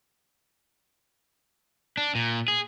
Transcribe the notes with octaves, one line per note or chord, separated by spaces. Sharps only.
D4
A#2
G#4